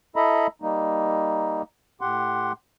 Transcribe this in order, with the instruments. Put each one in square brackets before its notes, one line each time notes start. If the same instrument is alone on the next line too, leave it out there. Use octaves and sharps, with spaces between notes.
[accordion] E4 A4 D#5 E5 A#5 B5
G3 A#3 D#4
A2 G4 F#5 C6